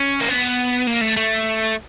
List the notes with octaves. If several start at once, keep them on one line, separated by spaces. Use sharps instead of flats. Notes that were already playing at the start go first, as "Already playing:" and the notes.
Already playing: C#4
A#3
B3
A#3
A3
A3